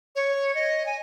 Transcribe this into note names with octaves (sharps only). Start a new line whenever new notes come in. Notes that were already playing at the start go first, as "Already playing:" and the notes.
C#5
D#5
G#5